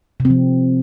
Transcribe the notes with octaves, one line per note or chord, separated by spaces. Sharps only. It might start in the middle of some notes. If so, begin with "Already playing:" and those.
C3
C4
F3